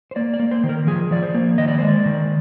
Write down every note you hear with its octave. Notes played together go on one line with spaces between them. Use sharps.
C5
A#3 D5
D5
A#3
C5
D#3
A#4
F3 G#4
F3 D5
C5
A#3
D#3 D#5
D5
G#3 C5
D5
D#3